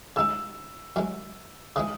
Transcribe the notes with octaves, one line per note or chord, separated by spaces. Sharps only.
C#3 G#3 D#4 E6
F#2 E3 G#3
C#3 E3 G#3 D#6